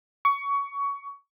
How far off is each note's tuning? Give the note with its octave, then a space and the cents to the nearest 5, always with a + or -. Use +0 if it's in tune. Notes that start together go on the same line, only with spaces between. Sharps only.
C#6 +20